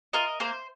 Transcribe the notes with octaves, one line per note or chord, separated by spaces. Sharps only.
F4 A#4 D#5
A#3 C5